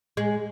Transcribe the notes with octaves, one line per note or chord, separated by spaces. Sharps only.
G#3